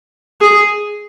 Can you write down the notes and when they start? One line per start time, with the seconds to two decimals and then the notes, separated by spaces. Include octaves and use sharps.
0.41 G#4